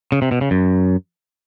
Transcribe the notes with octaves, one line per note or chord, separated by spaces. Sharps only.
C#3
C3
B2
C#3
F#2